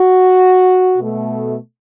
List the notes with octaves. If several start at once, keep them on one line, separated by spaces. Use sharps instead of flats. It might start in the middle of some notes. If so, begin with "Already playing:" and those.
Already playing: F#4
B2 A3